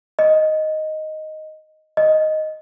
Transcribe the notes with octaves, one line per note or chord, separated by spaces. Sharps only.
D#5
D#5